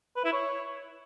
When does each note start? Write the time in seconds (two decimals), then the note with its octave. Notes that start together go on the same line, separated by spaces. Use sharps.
0.16 B4
0.24 E4
0.33 C#5